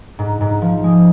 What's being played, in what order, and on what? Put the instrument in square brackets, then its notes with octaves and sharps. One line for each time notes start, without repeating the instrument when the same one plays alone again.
[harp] G#2
G#2
F3
G#3